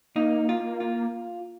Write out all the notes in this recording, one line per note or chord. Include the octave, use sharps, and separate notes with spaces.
A#3 D#4
F4
F4